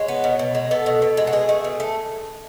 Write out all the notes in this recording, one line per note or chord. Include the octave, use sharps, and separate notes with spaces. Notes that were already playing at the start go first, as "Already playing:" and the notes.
Already playing: G#3 C#5
B3
B2
B2
G#3
B3 A4
B2
B2
G#3
F#4
B2 G#4
A3
B2
A3